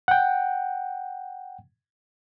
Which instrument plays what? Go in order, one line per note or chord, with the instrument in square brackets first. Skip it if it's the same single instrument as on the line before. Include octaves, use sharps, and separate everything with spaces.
[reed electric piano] F#5 G5